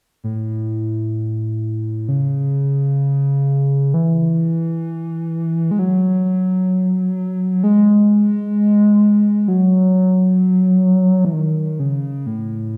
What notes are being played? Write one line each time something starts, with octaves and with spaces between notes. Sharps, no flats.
A2
C#3
E3
G#3
F#3
G#3
F#3
E3
D#3
C#3
A2